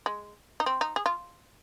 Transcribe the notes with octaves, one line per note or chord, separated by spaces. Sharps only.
G#3
D#4
C4
D#4
G#4
F4